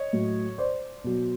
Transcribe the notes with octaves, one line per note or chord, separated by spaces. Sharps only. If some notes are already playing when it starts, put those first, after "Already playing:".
Already playing: C#5 D#5
A2 F#3
C5 D5
B2 F#3